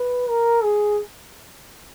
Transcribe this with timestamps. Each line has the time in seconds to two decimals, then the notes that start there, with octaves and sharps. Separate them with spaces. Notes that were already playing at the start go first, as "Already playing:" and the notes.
Already playing: B4
0.28 A#4
0.63 G#4